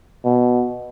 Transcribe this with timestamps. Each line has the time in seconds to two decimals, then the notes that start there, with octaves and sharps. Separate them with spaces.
0.25 B2